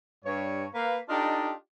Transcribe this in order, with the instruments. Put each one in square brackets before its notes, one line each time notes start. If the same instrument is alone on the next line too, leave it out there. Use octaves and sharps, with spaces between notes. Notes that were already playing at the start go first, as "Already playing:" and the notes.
[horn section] G2 C#5
A#3 B4 F5
D4 D#4 F4 G4 A4 D#5